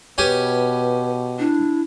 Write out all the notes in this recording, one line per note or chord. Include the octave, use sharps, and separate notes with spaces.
B2 C#4 G4 B4 G#5
D4 E4